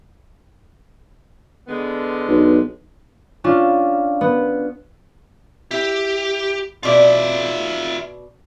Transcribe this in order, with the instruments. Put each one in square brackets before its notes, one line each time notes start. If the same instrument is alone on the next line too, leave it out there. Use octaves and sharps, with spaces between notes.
[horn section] D3 G#3 B3
[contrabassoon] B1
[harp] C#4 D4 F4
B3
[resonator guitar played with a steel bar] E4 [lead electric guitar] G4
[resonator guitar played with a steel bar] B2 D5 [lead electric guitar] F4 E5